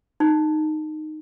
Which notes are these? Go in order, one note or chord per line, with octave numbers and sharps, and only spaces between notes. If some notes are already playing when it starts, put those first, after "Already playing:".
D#4